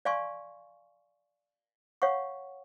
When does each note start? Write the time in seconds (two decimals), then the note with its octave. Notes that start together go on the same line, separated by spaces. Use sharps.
0.05 D5 F5 G#5 C6 C#6
2.02 C#5 F5 F#5 C#6